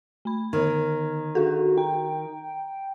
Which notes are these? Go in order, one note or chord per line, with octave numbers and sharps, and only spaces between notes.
A3 B5
D3 D#3 F6 G#6
D4 F#4 G#4 A4
G5 A#5